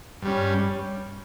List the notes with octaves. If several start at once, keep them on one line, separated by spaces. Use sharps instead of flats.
G2 G3 C#4